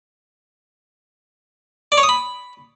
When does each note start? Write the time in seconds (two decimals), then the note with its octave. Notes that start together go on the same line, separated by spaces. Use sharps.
1.92 D5
1.98 C#5
2.03 D#6
2.09 B5